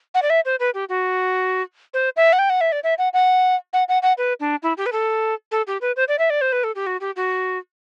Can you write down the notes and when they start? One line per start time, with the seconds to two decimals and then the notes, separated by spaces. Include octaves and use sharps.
0.15 F#5
0.22 D5
0.30 E5
0.45 C5
0.60 B4
0.74 G4
0.89 F#4
1.94 C5
2.17 E5
2.33 F#5
2.39 G5
2.50 F#5
2.61 E5
2.72 D5
2.84 E5
2.98 F#5
3.14 F#5
3.73 F#5
3.88 F#5
4.03 F#5
4.18 B4
4.40 D4
4.63 E4
4.77 G4
4.86 B4
4.92 A4
5.52 A4
5.67 G4
5.81 B4
5.97 C5
6.08 D5
6.19 E5
6.30 D5
6.41 C5
6.52 B4
6.64 A4
6.75 G4
6.87 F#4
7.01 G4
7.16 F#4